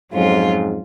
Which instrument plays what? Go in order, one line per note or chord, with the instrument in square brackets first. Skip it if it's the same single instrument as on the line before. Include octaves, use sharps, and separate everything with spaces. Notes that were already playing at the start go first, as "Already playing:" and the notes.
[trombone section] F2 G#2 [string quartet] F#3 C#4 F4